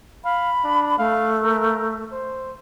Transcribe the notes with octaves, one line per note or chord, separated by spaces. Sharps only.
F5 B5
D4
A3 F5
A#4
C5